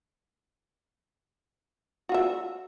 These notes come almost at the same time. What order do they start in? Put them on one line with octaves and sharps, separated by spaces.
F#4 F4 E5